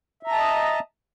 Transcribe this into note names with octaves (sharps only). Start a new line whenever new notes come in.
D#5 E5 A5 A#5